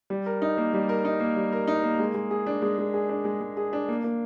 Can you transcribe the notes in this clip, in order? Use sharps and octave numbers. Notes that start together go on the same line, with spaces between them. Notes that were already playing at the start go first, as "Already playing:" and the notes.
G3
A#4
D#4
A#3
G3
A#4
D#4
A#3
G3
A#4
D#4
A#3
G#3
G#3
G#4
D4
G#3
G#3
G#4
D4
G#3
G#3
G#4
D4
A#3
A#3